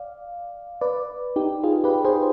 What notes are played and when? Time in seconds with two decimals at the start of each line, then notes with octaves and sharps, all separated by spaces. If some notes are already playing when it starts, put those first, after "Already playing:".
Already playing: D5 F5
0.81 B4 D5
1.36 D#4 G4
1.64 F4 G#4
1.84 G4 B4
2.05 G#4 C5